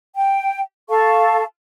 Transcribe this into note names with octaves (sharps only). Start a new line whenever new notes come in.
G5
A4 F5 A5 C#6